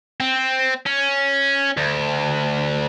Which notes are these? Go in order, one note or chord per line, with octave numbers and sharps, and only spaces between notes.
C4
C#4
D2